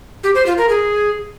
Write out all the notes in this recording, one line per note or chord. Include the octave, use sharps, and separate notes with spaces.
G4
C5
F4
A#4
G#4